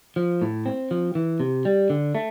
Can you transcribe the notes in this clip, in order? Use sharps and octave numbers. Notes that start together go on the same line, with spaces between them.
F3
A2
C4
F3
E3
C3
G3
D3
A3